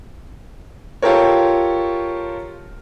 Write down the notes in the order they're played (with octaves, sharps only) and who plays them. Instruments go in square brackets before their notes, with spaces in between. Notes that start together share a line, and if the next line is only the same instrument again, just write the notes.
[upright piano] F4 G4 A4 A#4 C#5